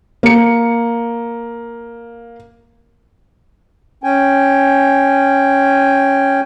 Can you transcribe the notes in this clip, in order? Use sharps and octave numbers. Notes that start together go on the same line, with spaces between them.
A#3 C#7
C#4 G5 G#5